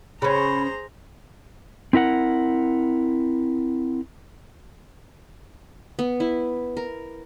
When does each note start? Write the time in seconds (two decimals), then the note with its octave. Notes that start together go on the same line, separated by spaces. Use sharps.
0.22 C#3 C#4 G#4 C5 A#5 B5
1.93 C4 E4 A#4 F#5
5.99 B3
6.20 E4
6.77 A#4